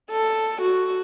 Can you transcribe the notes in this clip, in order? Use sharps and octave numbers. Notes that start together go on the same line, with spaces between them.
A4
F#4